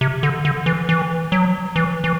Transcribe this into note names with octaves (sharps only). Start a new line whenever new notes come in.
C3
D3
D3
E3
E3
F#3
E3
E3